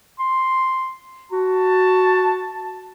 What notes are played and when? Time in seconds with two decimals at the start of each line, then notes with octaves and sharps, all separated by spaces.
0.19 C6
1.32 F#4 A5